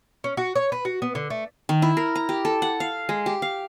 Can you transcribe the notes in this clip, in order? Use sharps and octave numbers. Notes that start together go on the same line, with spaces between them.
C#4
F#4
C#5
B4
F#4
B3
D3
A3
D#3
E4
A#4
A#5
G4
A4
F#5
F5
G#3
G4
F5